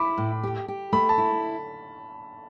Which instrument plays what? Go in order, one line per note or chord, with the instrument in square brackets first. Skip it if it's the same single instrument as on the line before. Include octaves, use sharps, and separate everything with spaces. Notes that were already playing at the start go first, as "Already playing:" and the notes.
Already playing: [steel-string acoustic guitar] E4 [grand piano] B5 D6
[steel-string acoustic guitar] A2
G4
G4
[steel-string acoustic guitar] A3 [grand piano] B5
[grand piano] A5
[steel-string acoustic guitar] E4